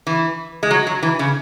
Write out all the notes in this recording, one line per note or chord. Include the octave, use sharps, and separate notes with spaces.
E3
G#3
F#3
F#3
E3
C#3